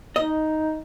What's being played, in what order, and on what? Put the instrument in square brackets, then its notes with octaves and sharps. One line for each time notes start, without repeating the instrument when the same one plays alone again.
[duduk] D#4 [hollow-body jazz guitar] D#5